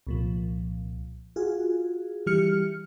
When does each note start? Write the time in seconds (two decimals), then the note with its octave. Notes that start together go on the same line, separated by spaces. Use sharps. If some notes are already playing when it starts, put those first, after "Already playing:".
0.07 C2 A#2 F3
1.36 F4 F#4 G#4
2.26 E3 G3 G4 F6 C#7